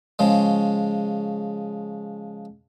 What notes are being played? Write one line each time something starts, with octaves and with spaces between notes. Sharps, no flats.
C#3 F3 G#3